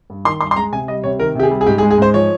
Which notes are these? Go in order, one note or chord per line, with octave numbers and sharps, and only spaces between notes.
G2
D#3 C6
G2 C6
C6
G#3 A#5
C3 G#5
G3 D#5
C3 C#5
D#3 A#4
C3 G4
G#4
G3
G#4
G#2 G4
G#4
G#3
G#4
G#2 C5
F3 C#5